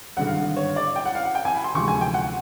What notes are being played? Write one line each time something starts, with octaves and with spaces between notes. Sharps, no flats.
G#1 G2 D3 F#5
F5
C#5
D5
G5
F#5
F5
F#5
G5
G#5
B5
C6
D2 C3 F3 G#3 C#6
G#5
G5
F#5